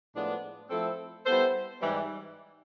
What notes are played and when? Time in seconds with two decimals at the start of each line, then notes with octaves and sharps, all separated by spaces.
0.14 A2 F3 G#3 B3 D4
0.70 F3 A3 C4 E4 A4
1.25 G3 B3 E4 A4 C5
1.80 G#2 E3 G3